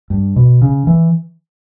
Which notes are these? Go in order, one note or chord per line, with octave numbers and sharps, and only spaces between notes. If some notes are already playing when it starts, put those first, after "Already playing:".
G2
B2
C#3
E3